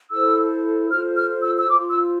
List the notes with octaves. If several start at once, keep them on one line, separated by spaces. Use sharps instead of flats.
E4 A4 C5 E6
F4 A4 C5 F6
F6
E6
E6
F4 C5 D6
E6